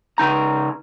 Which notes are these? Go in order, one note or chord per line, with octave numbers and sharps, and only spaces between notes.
C#3 D#4 A#5